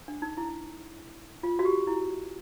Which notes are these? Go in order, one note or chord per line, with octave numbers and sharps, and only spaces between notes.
D4
D#4
E4
F4
F#4
G4
E4